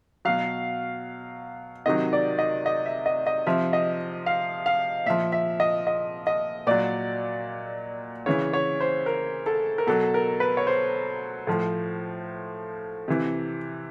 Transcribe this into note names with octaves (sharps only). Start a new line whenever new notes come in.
B2 F#3 F5
C3 D#3 F#3 D#5
D5
D#5
D#5
E5
D#5
D#5
C3 F3 E5
D#5
F5
F5
A#2 F3 E5
E5
D#5
D#5
D#5
A#2 F#3 D5
C#3 E3 C#5
C#5
C5
A#4
A4
A#4
B2 F#3 A4
A#4
B4
C#5
C5
A2 F3
C3 E3